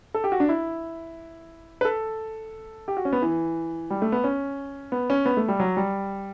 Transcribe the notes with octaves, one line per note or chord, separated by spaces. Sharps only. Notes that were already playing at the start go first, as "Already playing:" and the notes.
A4
G4
F#4
D4
E4
B4
A4
G4
F#4
C#4
B3
E3
G3
A3
B3
C#4
B3
C#4
B3
A3
G3
F#3
G3